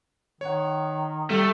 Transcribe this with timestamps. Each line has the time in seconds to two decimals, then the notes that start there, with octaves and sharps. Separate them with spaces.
0.41 D#3 C#5 F#5
1.30 G3 A3